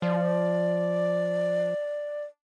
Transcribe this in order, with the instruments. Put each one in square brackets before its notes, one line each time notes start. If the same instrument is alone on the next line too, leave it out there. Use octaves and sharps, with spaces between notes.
[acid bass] F3 [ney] D5